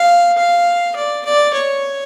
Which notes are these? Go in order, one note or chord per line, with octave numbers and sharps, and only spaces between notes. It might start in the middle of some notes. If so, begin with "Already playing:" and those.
Already playing: F5
F5
D5
D5
C#5